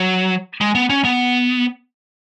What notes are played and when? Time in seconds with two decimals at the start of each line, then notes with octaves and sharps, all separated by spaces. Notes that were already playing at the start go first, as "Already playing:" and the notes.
Already playing: F#3
0.61 G#3
0.75 B3
0.90 C#4
1.05 B3